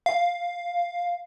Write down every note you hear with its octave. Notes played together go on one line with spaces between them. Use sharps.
F5